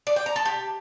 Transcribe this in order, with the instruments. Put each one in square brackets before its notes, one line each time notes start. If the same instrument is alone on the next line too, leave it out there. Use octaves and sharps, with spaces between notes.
[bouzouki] D5
G5
A#5
A4
G4